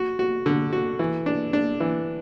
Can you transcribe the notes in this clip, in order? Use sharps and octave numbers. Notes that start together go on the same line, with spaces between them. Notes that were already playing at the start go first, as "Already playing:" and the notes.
Already playing: F#4
F#4
D3
F#4
E3
D4
D4
E3